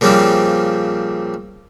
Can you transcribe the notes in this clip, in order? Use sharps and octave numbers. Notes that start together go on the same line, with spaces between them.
A#2 C#3 F3 G3 C4